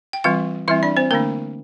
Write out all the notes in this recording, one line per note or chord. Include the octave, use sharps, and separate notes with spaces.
G5
E3 G3 C4 F4 F5
E3 G3 C4 E4 E5
D4 D5
C4 C5
D3 A3 A#3 D4 A#4